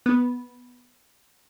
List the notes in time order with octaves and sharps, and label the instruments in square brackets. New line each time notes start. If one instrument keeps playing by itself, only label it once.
[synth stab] B3